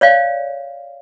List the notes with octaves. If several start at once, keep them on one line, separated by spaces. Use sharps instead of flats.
C#5 D5 F5